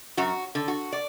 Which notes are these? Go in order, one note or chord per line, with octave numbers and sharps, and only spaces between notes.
F#2 F#4
D3
F#4
D5